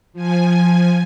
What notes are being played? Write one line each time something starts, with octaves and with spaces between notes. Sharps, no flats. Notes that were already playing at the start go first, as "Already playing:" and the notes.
F3 G#5